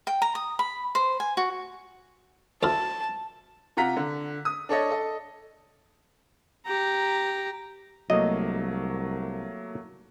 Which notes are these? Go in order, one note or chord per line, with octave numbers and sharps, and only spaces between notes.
G5
A#5
D#6
B5
C5
G#5
F#4
D2 E4 F4 A5
C3 F4 F#5 A#5 B6
D3
D#6
D4 A4 C#5 D#5
A4 D#5
G4 A#5
C2 F#3 A3 A#3 D#5